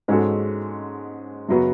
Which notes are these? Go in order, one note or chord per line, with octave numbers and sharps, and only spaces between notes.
G#2 G#3 C#4 F#4 A4
F#2 C#3 F#3 B3 F#4